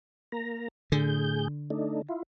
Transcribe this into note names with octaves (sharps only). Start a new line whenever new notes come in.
A#3 A#5
A2 D3 G#4 G6
A3 D4 D#4
E4 F4